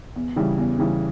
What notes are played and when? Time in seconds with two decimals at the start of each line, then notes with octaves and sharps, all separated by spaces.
0.16 E2
0.36 C#3 E3 G3
0.58 E2
0.79 C#3 E3 G3